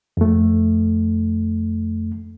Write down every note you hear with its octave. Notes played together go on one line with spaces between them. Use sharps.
F2 A3